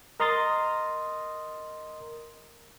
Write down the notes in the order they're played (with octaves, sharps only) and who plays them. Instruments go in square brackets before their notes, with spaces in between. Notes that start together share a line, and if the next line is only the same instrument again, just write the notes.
[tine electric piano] A#4 D#5 A#5 C6 D#6 A6